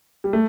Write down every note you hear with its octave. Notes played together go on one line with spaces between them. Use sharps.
G3
A3